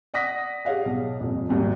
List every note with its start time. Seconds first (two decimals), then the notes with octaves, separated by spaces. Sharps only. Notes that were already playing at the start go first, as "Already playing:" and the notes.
0.14 D5 F#5 D#6 A#6 B6
0.65 G4 G#4 C#5 F5 F#5
0.86 B1
1.20 D#1 F2
1.49 G#1 D#2 F#3 G3